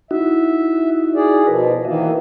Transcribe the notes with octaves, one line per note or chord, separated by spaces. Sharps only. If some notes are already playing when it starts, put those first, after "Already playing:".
D#4 E4 F#4 E5
G#4 D5
B2 F3 A#4 B4
D#3 E3 A#3 F#4 D#5 E5